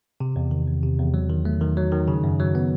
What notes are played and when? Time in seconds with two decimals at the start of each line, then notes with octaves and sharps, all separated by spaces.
0.20 C3
0.36 E2
0.51 D#3
0.67 E2
0.83 C3
0.99 E2
1.14 F#3
1.30 D#3
1.45 A3
1.61 D#3
1.77 F#3
1.92 D#3
2.08 C#3
2.24 F#2
2.39 F#3
2.55 B3